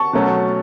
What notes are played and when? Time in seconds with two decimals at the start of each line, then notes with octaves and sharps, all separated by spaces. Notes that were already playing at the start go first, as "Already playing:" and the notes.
Already playing: A5 C#6
0.13 B2 F#3 A3 C#4